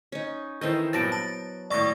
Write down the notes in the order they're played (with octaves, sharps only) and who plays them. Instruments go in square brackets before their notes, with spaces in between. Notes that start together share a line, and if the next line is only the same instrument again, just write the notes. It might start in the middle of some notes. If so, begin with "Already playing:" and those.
[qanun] C#4 D#4
[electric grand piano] D#3 A4 C5 [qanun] E3 C4 D#5 [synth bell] G6
[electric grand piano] G2 A#2 A5 [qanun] F#3 B3 [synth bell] A6 A#6 D7
[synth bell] A5 [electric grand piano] D7
[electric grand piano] G#1 A2 [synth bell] D5 C#6 A#6